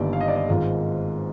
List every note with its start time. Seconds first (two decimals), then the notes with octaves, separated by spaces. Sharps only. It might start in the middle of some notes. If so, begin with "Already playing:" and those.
Already playing: G1 G2 D#3 G3 A#3 D5
0.13 F5
0.21 D#5
0.28 D5
0.36 D#5
0.48 G#1 G#2 D#3 G#3 F4